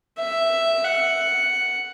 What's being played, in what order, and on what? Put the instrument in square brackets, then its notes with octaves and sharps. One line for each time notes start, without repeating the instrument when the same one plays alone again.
[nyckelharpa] E5
F#5